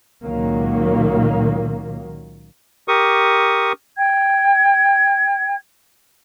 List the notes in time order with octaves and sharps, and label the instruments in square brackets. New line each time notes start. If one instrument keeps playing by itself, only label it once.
[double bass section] C#2 A#2 D#3 F#3 A#3
[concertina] G4 A#4 C#6 D#6
[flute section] G5 G#6